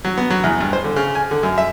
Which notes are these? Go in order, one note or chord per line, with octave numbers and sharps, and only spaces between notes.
F#3
B3
F#3
E2
G2
C5
D3
C#3
G#5
D3
F#2
E5